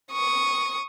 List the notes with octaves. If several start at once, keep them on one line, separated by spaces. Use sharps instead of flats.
C#6 D#6